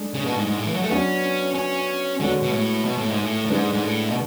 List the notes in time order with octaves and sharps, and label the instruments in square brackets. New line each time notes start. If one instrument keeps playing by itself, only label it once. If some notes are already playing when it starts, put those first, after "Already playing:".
Already playing: [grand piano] G#3 D4 A4
[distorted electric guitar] C#3
B2
G#2
G#2
A2
E3
F#3
A3
[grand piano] F#3 B3 D4 F#4 B4 [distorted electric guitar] C#4
[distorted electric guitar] C#4
[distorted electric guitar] D3 [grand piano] G#3 B3 F#4 C#5
[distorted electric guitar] B2
A2
B2
A2
G#2
A2
A2
[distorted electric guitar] G#2 [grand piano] D3 G#3 D4 G#4 B4
[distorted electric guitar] G#2
A2
B2